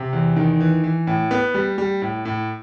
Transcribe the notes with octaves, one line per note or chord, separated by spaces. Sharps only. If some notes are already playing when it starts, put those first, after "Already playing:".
Already playing: C3
E2
D#3
E3
E3
A2
B3
G3
G3
A2
A2